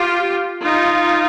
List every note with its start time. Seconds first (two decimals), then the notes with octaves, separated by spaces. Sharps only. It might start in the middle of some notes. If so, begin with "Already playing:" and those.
Already playing: F4 G4
0.63 D#4 F4